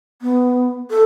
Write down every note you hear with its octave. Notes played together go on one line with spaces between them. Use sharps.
B3
A4